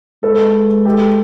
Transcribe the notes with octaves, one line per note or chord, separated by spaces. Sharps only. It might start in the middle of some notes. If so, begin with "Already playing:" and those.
G#3 A4 B4
G4 A4